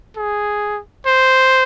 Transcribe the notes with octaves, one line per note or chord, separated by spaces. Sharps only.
G#4
C5